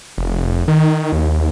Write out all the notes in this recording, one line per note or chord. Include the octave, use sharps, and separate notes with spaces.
F1
D#3
D#2